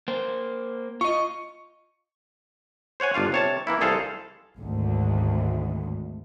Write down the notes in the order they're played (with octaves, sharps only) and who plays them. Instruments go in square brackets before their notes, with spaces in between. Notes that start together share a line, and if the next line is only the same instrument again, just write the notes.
[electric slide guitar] A#3 C5
[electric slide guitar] F4 D#5 [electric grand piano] C#6
[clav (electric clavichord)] C5 C#5 F#5 G#5
G1 D4 F4 F5
C3 C#5 A5
E3 A#3 E4
C2 G#4 A4 C5 F5
[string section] G#1 D2